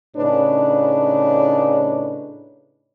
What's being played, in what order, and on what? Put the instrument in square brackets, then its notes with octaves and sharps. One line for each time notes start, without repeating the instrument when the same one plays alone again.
[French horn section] A2 C#3 D4 D#4 B4 C#5